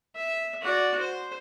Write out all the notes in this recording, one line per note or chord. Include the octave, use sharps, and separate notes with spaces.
E5
F#4 D5
C5